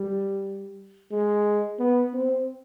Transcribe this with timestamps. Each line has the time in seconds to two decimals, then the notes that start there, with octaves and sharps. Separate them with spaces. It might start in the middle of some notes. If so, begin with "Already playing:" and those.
Already playing: G3
1.11 G#3
1.79 B3
2.14 C4